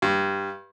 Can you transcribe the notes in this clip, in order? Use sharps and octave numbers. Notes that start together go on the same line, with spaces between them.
G2